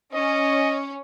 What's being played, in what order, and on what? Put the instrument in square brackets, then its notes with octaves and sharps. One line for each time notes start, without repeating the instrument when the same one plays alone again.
[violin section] C#4 [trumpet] D#5